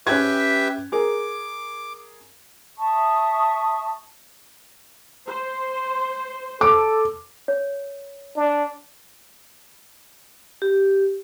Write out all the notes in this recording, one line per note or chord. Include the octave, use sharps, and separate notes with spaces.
C#4 G4 B4 E5 F#6 G#6
G#4 A#4 D6
E5 A5 C#6 D#6
C5
A4 D6
C#5
D4
G4